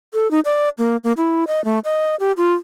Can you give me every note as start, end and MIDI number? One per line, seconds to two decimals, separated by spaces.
0.14 0.30 69
0.31 0.40 63
0.45 0.69 74
0.78 0.97 58
1.04 1.12 58
1.17 1.44 64
1.47 1.63 75
1.65 1.79 57
1.85 2.16 75
2.20 2.32 67
2.37 2.53 65